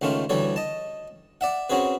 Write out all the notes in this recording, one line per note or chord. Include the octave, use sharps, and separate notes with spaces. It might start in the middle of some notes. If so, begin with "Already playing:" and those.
C#2 D#3 A3 C#4 F4
D2 E3 G3 A4 C#5
D#5 A5
D5 E5 F#5
C4 C#4 F#4 G#4 B4